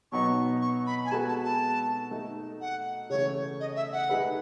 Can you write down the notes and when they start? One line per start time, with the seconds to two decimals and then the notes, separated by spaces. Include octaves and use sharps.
0.12 B2 F#3 B3 D#4 F#4 C#6
0.62 C#6
0.86 B5
1.05 G#5
1.12 G#3 B3 F#4 A4 A5
1.28 A5
1.44 A5
2.11 A3 D#4 A4
2.61 F#5
3.10 C#3 E3 A3 C#5
3.60 D#5
3.76 E5
3.93 F#5
4.09 A3 D#4 G#4 B4